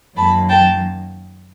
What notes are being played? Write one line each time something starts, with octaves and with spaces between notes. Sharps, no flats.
F#2 D#3 F#3 A#3 A5 B5
G5 A5